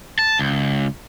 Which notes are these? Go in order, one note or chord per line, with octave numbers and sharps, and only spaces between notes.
A5
C#2